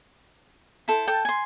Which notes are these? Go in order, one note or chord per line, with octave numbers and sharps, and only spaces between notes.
E4 A4 C5
A4 G5 A5
G#5 C6